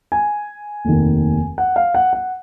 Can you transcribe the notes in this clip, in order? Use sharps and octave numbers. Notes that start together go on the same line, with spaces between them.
G#5
F1 D#2 D#3
F#5
F5
F#5
F#5